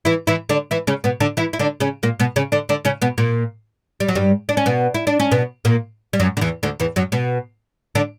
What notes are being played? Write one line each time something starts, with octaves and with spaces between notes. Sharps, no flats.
E3 E4
E3 E4
D3 D4
E3 E4
C#3 C#4
B2 B3
D3 D4
E3 E4
E4
D3 D4
C#3 C#4
A#2 A#3
B2 B3
C#3 C#4
D3 D4
D3 D4
C#3 C#4
B2 B3
A#2 A#3
G3
F#3
G2 G3
D4
C#4
B2 B3
E4
D4
C#4
B2 B3
A#2 A#3
G3
F#2 F#3
D3
E2 E3
D2 D3
E2 E3
F#2 F#3
B2 B3
D3 D4